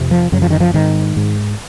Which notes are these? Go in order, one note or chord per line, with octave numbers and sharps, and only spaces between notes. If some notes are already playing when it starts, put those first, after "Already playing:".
Already playing: F2 C3
F3
F#2 C#3 F#3
F3
D#3
F3
G#2 D#3
G#2